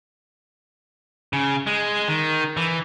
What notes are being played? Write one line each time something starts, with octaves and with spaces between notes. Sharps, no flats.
C#3
G#3
D#3
E3